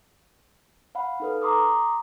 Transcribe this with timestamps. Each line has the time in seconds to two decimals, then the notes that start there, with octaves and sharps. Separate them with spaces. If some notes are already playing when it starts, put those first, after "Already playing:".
0.95 F5 F#5 B5
1.20 D#4 A4 B4
1.42 A#5 C6 D6 D#6